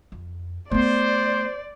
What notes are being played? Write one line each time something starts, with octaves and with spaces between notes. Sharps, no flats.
F2
A3 B3 C5 D5